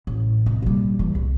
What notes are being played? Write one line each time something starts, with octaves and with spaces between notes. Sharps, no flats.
A1
C2
A#2 G3
E2 E3
C2